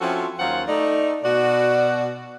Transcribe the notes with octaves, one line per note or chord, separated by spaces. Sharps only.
F3 C4 C#4 E4 F#4 A4
D#2 F#3 C#4 F4 C5 F#5
A3 D#4 D5
B2 F#4 D5